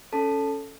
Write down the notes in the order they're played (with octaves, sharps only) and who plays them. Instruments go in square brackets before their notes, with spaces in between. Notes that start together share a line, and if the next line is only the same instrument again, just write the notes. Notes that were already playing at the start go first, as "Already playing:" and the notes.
[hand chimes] C#4 A4 A5